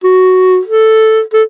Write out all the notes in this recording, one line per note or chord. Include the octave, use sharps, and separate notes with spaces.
F#4
A4
A4